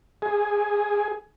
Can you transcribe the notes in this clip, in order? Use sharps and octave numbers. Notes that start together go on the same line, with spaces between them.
G#4